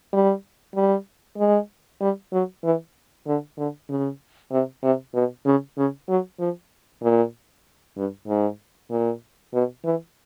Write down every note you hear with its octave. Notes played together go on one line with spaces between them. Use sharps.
G3
G3
G#3
G3
F#3
E3
D3
D3
C#3
C3
C3
B2
C#3
C#3
F#3
F3
A#2
G2
G#2
A#2
B2
E3